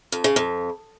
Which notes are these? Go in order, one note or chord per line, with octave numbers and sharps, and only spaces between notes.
F2
C#3
F2